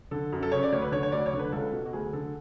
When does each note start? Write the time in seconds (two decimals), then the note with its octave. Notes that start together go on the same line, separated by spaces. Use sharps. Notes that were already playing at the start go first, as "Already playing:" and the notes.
0.11 D3 A4
0.32 F#2
0.42 A4
0.52 C#3 C#5
0.63 D5
0.72 D2 C#5
0.82 B4
0.92 D3 C#5
1.03 C#5
1.12 D2 D5
1.26 C#5
1.33 D3
1.39 B4
1.52 C#2 A4
1.72 B2
1.85 F#4
1.93 D2 G#4
2.13 D3 A4